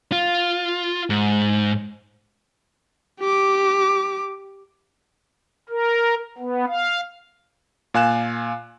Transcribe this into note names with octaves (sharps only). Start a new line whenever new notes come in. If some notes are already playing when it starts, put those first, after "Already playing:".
F4
G#2
G4 D6
A#4
B3
F5
A#2 F5 G#5 F#6 E7